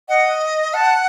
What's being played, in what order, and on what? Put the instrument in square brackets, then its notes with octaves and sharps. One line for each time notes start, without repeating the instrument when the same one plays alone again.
[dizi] D#5 [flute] F#5
[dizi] F#5 [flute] A5